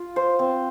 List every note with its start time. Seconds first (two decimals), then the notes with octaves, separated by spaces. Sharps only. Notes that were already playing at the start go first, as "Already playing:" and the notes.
Already playing: F4
0.16 C5
0.39 C4